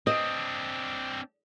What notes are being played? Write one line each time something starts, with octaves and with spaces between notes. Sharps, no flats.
C4 D4 D#5